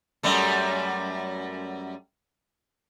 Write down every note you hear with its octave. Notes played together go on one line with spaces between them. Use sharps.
F#2 G3 A3